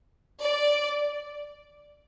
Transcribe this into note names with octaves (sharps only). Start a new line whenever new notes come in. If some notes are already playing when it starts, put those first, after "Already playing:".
D5